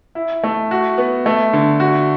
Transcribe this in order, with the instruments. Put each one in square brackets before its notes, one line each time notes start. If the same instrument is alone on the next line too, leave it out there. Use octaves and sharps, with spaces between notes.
[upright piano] E4
A3
F#4
B3
A3
D3
F#4